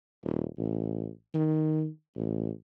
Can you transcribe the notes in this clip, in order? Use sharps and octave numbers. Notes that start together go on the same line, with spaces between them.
D#1
A1
D#3
A1